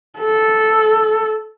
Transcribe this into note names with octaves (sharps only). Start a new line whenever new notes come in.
A4